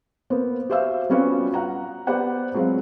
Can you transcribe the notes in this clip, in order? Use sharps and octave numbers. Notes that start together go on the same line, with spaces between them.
A#3 B3 C5
F#4 G4 C5 E5 F5 E6
G3 B3 C#4 F4 F#4
F5 F#5 A#5
B3 G4 C5 D5 F#5 B5
F#3 G#3 C4 F4